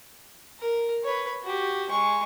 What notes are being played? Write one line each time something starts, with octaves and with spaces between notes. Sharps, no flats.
A#4
B4 C#5
F#4 G4
G#3 C#6